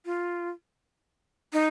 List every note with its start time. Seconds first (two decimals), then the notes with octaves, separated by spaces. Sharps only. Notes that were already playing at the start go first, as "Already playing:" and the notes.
0.05 F4
1.53 D#4